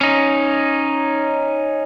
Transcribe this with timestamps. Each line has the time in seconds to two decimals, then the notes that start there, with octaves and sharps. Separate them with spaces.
0.01 C#4 D#4